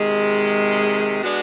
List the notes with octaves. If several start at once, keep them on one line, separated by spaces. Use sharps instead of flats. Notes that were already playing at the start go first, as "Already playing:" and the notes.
Already playing: C3 D#3 G#3
G#3 B3 D4 F#4